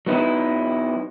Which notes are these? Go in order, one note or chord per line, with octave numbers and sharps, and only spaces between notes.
F#3 B3 D#4 E4